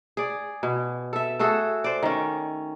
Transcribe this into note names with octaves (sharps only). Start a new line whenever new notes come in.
G#4 D5
B2
A4 E5
A3 F#4 G#4 A4
C5 D5
D#3 C#4